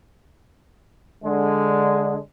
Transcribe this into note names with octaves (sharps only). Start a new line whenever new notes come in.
D3 G#3